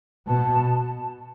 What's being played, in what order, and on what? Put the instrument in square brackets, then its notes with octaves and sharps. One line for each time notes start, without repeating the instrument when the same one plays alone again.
[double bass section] B2 [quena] A5